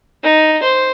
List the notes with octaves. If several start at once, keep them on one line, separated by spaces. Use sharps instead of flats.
D#4
C5